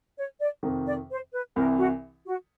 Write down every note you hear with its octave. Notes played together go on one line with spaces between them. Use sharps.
C#5
D5
F2 C3 D#3
D5
C5
B4
C2 C3 E3 A#4
F#4
F#4